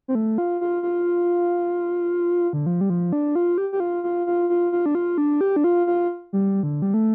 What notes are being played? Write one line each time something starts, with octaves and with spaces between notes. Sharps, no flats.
C4
A3
F4
F4
F4
D3
F3
G3
F3
D4
F4
G4
G4
F4
F4
F4
F4
F4
D4
F4
D4
G4
D4
F4
F4
G3
D3
G3
A3